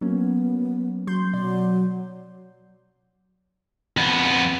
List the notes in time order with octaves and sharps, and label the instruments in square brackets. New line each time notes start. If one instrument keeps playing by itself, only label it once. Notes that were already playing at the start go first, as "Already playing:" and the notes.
[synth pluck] F#3 A#3 C#4 [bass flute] B3
[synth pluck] F#3 C6 G6
[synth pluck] B2 D5 [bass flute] F#3
[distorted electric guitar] F2 B3